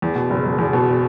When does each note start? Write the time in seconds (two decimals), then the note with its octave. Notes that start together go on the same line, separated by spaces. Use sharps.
0.02 E2
0.16 B2
0.30 F#1
0.45 F#1
0.58 E2
0.73 B2